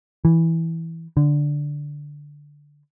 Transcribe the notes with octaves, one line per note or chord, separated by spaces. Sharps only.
E3
D3